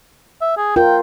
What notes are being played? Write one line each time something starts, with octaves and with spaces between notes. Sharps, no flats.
E5
G#4
F4 A#4 G5